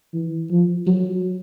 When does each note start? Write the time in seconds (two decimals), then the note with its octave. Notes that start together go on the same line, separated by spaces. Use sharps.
0.14 E3
0.50 F3
0.86 F#3